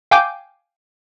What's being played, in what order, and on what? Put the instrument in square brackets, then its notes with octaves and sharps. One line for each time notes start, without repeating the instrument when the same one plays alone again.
[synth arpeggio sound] F5 G5 G#5 D6 G6